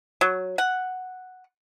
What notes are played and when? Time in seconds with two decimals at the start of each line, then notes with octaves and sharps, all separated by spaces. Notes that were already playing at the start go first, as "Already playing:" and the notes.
0.21 F#3
0.58 F#5